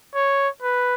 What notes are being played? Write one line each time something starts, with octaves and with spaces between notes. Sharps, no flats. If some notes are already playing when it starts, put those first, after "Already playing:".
C#5
B4